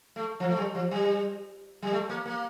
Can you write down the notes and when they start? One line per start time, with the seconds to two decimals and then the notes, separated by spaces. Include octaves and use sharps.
0.16 A3
0.40 F3
0.49 A3
0.57 G3
0.75 F3
0.91 G3
1.82 G3
1.92 A3
2.09 A#3
2.26 A#3